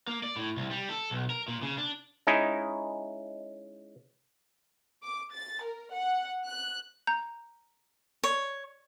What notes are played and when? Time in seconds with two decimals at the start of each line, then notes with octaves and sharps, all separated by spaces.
0.08 A#3
0.23 D5
0.36 A2
0.57 C2
0.71 G3
0.89 A4
1.11 B1
1.30 A#4
1.48 A#2
1.62 C#3
1.78 D4
2.27 G#3 C#4 D#4 E4
5.04 D6
5.33 A6
5.63 A#4
5.93 F#5
6.44 F#6
7.07 A#5 G6
8.24 C#5